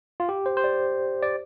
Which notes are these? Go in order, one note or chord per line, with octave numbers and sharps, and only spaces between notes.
F4
G4
C5
C5
D5
D5